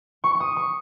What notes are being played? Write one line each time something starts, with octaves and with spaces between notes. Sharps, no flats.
C#6
C#6
D#6
C#6